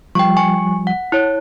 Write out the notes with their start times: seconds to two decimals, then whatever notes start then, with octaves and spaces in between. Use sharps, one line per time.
0.15 F3 G3 G5 C#6
0.37 G#5 C#6
0.87 F#5
1.12 E4 C#5